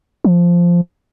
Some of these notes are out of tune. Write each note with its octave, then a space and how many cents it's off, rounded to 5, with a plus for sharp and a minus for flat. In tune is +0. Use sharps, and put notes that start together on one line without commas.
F3 -5